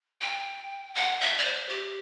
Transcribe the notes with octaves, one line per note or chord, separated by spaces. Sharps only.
G5
F#5
E5
D5
C5
G4